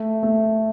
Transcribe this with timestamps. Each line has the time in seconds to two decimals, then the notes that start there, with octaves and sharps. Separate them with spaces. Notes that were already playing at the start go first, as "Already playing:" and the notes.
Already playing: A3
0.23 A3